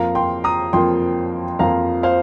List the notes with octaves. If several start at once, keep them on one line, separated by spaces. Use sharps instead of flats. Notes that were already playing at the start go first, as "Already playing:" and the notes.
Already playing: F2 F3 A#3 F5 A#5
G5 C6
A#5 D#6
F2 F3 A#3 G5 C6
F2 F3 A#3 F5 A#5
C5 F5